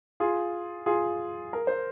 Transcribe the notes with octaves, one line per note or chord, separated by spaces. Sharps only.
F4 G#4
F4 G#4
A#4
C5